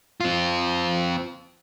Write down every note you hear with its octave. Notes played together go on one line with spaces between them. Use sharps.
C4 F4